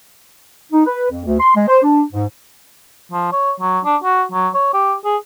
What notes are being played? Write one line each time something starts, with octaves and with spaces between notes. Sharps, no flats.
D#4
B4
F2
D2
C6
G#3
C5
D4
G#2
F3
C#5
F#3
D4
F#4
F#3
C#5
G4
G#4